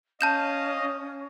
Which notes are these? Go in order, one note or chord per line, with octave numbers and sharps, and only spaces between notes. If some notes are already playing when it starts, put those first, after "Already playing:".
C#4 D#5 F5 A5 D#6 G6 E7